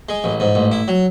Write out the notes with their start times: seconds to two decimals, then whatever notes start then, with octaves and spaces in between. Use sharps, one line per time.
0.09 G#3
0.24 A1
0.40 G#2
0.55 A1
0.72 E4
0.88 F#3